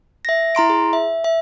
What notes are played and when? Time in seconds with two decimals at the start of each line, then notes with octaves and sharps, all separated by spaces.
0.25 E5 A#6
0.55 E4 A#5 C6 D7
0.70 G#4
0.93 E5
1.24 E5